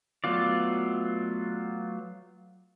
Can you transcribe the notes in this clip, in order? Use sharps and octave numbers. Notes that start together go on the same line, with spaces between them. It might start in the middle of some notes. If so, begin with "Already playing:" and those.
F#3 A3 B3 F4 D5